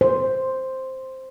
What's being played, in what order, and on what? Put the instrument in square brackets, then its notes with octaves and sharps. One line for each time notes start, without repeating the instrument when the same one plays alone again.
[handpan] C5